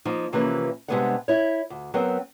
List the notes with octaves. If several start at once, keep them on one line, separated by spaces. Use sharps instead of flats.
F3 A#3 D#4
C3 E3 F3 A#3 C#4 B4
C3 G3 G#3 B3 D4 F#5
E4 C#5
D2
F#3 B3 C4 A#4